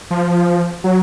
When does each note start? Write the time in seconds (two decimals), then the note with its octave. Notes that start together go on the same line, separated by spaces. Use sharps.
0.11 F3
0.84 F#3